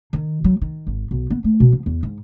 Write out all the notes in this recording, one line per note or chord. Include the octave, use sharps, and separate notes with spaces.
D#3
F#3
D#3
G#1
B1
B3
A3
B2
F3
E2
G#2